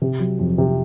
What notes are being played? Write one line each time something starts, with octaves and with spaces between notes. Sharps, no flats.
C3
F#3
F2
C3